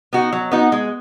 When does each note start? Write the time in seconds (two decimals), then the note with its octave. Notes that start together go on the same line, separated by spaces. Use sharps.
0.13 B3 D#4 F#4
0.33 F#3
0.52 B3 D#4 F#4
0.72 G#3